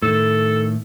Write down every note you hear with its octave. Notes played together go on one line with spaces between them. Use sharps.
A2 D#3 A4